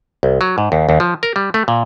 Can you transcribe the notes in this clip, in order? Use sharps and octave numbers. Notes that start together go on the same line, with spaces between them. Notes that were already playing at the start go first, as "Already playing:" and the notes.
C2
F#3
G#2
D#2
D#2
F3
A#4
G3
A3
A#2